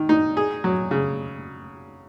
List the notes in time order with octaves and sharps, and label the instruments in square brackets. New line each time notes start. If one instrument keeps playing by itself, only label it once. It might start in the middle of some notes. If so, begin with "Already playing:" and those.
Already playing: [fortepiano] D#3
D#4
G#4
F#3
C#3